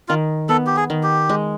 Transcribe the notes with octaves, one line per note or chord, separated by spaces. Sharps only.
D#3 F4
B3 A4
G4
G#4
D#3
G4
G#3